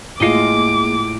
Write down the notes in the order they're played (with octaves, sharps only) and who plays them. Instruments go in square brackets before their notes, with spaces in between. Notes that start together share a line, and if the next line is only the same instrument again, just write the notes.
[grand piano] A2 C7 [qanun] G#3 F4 D#5 [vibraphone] A#3 G#4 [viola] D6